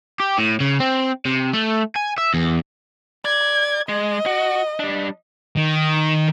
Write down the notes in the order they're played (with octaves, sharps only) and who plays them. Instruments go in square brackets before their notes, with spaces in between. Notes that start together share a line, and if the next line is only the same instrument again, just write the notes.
[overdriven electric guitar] G4
A2
C#3
C4
C3
A3
G#5
E5
E2
[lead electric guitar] D5 [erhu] G#6
[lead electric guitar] G#3 [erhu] D#5
[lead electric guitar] F#4
G3 D4
[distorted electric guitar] D#3